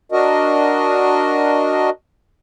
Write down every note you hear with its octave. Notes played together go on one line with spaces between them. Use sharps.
D4 F#4 A#4 D#5